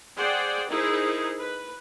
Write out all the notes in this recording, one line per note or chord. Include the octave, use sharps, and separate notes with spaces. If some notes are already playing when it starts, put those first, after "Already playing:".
G#4 C5 D5 F#5 G5
D#4 E4 G#4 A#4 C5
B4